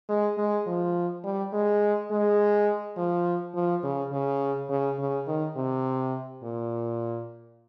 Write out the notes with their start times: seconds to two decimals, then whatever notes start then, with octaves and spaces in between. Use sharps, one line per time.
0.09 G#3
0.38 G#3
0.66 F3
1.24 G3
1.53 G#3
2.11 G#3
2.97 F3
3.55 F3
3.83 C#3
4.12 C#3
4.70 C#3
4.99 C#3
5.28 D#3
5.56 C3
6.43 A#2